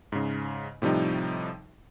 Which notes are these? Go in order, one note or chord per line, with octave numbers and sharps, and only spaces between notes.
G#2 C#3
A2 C3 F3 G3 D#4